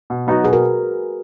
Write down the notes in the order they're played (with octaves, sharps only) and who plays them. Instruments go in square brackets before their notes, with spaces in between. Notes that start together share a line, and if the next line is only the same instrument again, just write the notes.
[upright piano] B2
F#3 B3 D#4 F#4
[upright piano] B2 [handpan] G#4 B4
[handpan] F#4 A#4